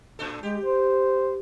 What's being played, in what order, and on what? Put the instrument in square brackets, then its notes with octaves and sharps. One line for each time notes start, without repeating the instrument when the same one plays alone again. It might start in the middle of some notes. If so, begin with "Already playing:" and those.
[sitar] A2 D4 A4
[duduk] G#3 [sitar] G4
[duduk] C5